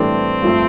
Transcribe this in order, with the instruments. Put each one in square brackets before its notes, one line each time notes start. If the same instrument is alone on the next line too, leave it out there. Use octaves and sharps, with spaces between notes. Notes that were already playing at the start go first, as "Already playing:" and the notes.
Already playing: [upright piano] A2 E3 G3 D4 A4 [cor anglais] C4
[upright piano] G2 F3 A3